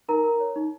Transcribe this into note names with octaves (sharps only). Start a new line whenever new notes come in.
D#4 A#4 A#5
A#4
C#5
D#4